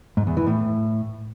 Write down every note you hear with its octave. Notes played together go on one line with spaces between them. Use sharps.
G#2
E2
E3
A2